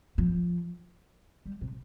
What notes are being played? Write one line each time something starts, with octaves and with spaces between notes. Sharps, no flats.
F3
G3
C3